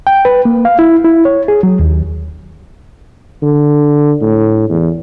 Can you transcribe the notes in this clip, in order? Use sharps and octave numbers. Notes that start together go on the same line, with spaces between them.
G5
B4
A#3
F5
E4
E4
C#5
G#4
F#3
D#2
D3
A2
E2